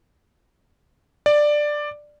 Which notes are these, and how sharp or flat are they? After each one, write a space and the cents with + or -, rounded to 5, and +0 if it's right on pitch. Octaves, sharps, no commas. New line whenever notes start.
D5 +10